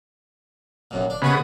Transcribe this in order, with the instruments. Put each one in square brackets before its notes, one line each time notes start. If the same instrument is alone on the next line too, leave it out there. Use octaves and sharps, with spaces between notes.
[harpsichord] B1 F#2 A#2
D4
[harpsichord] D#2 F#4 D#6 [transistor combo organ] C#3 B3